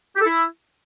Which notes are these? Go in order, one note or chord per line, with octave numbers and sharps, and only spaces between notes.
G4
A4
E4